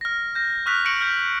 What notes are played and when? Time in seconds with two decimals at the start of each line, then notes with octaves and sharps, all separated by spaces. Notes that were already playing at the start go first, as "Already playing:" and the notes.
0.01 F6 A#6
0.35 G6 A#6
0.66 C#6 D#6 F6 F#6 B6 F7
0.85 C#6 A#6 C#7 D7 F#7
1.01 F6 G6 F#7